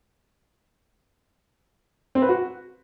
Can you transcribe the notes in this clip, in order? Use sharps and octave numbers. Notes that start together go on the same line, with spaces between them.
C4
B4
F#4